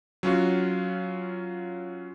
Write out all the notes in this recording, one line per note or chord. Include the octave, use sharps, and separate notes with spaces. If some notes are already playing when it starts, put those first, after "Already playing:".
F#3 C#4 F4 F#4